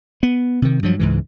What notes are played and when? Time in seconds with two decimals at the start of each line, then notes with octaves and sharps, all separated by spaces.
0.23 B3
0.62 C3 D#3
0.83 G2 F3 F#3
0.99 C#2 G#2 E3